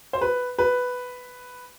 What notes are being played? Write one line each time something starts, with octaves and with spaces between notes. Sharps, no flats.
C5
B4
B4